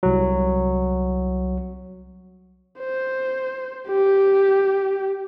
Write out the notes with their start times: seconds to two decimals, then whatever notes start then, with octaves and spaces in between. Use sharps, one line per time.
0.03 C2 F#3
2.80 C5
3.88 G4